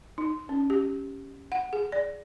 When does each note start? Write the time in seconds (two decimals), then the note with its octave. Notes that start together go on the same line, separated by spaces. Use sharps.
0.18 D#4
0.49 C#4
0.70 G4
1.52 F#5
1.73 G#4
1.92 D5